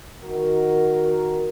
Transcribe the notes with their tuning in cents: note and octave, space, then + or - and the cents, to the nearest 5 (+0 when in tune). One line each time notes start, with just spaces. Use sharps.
D#3 +10 F#4 +0 A#4 +0